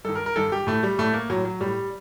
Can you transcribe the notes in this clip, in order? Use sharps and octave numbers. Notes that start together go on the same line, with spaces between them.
G2 D#3 A4
A#4
A#4
G2 D#3 A4
G4
A2 A3
G3
A2 A3
A#3
A2 F#3
F#3
A2 G3